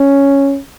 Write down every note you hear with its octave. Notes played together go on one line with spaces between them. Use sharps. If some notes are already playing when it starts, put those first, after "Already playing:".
Already playing: C#4